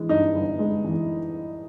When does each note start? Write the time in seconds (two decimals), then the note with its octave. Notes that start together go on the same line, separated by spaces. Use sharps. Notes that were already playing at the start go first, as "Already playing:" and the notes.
Already playing: E3 G#3
0.09 G2 D#4
0.34 G1
0.59 G#3
0.84 E3